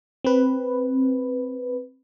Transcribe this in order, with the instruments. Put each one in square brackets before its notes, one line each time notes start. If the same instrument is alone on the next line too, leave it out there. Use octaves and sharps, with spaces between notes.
[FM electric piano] C4 B4